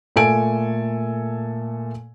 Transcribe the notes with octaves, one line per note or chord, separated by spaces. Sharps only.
A#2 A3 A4 G#5 D7